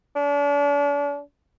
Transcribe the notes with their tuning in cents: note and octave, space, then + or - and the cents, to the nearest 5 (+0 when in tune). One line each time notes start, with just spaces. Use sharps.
D4 -40